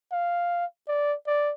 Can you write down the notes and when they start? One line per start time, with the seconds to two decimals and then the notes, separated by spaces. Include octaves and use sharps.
0.12 F5
0.88 D5
1.27 D5